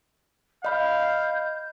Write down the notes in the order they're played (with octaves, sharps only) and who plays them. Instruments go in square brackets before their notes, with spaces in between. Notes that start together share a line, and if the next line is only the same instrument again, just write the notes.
[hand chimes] D#5 B5 [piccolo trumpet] F5 [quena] G6